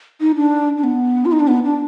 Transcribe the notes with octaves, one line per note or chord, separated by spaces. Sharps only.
D#4
D4
D4
B3
F4
D#4
D4
B3
D4